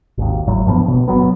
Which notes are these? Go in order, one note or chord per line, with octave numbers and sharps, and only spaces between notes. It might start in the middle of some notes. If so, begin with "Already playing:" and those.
G#1 D#2
G#1 A2 F#3
F1 G2 F3 B3
B2
G1 E2 F#3 B3